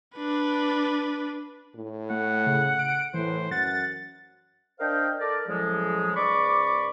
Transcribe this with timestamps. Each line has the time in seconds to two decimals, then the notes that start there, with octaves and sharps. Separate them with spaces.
0.16 D4 B4
1.76 A2
2.10 A3 F#5
2.47 C#3
2.79 D7
3.14 A2 E3 C5
3.51 F#2 F#5 A6
4.80 D4 A#4 C5 D#5 F5 G5
5.20 A4 A#4 D5
5.48 A2 C#3 F3 F#3 G#3
6.16 C#2 G#2 D5 B5 C#6 D6